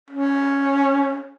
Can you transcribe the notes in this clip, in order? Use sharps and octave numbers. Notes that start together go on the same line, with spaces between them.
C#4